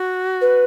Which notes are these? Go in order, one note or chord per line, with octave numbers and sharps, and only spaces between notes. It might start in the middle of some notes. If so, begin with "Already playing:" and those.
Already playing: F#4
B4